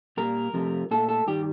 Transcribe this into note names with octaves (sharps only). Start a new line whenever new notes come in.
A#2 G3 A#3 A#4
F2 C3 F3 A3
A#2 A3 A4
A4
G2 D#3 G3 G4